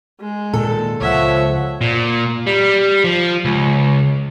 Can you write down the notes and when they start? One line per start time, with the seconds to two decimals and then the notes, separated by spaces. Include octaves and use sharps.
0.20 G#3
0.53 A#2 D#3 A4
1.01 C#2 F3 C#5 E5 F#5
1.81 A#2
2.47 G3
3.04 F3
3.45 C#2